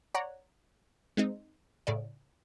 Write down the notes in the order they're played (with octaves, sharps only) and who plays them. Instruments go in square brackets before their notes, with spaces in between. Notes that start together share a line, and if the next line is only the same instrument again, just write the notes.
[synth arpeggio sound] C#5 D5 F#5 A#5
G#3 C4 D#4
A2 C#3 D5